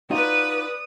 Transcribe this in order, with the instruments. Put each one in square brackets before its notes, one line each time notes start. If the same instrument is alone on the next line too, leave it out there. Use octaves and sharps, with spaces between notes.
[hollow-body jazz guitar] D#4 F4 F#4 [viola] B4 D5 [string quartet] D#6